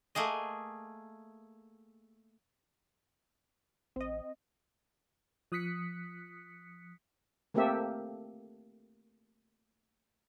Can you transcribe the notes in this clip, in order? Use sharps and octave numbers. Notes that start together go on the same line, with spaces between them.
A3 A#3 G#4 D#5
A1 C4 D#5
F3 D#6 F#6 B6 C#7
A3 A#3 C4 G4 A4 E5